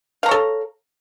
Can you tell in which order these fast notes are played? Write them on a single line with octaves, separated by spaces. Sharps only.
F5 A#5 C#5 A4